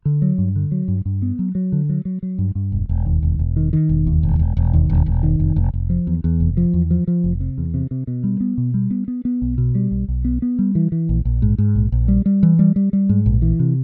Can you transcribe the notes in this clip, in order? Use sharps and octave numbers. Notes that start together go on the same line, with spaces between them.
D3
F#3
G2
D3
F#3
G2
G2
B3
F#3
F#3
D3
F#3
F#3
F#3
G2
G2
E1
E1
D#2
E1
E1
D#3
D#3
E1
D#2
E1
E1
E1
D#2
E1
E1
D#3
F1
F1
F1
F3
E2
E2
F1
F3
E2
F3
F3
F1
C3
E2
C3
C3
B2
G3
B3
B2
G3
B3
B3
B3
B1
B2
G3
B1
B1
B3
B3
G3
E3
E3
A#1
A#1
G#2
G#2
A#1
A#1
G3
G3
E3
G3
G3
G3
G#2
A#1
E3
C3